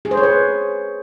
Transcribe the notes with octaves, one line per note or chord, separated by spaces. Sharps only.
G#4
C5
C#5
B4